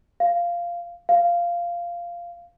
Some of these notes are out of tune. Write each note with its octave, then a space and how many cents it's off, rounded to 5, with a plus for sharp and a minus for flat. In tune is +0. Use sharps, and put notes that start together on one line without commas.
F5 -10
F5 -10